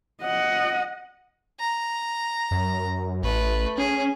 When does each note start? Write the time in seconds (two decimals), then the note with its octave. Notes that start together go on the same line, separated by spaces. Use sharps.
0.22 D#5 F#5
1.60 A#5
2.51 F#2
3.23 A1 A3 B4
3.78 C#4 G#4